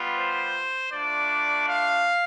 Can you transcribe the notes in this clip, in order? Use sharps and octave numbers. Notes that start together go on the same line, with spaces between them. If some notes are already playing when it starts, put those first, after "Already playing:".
Already playing: G3 B3 F4
C5
A3 D4 F4 D5
F5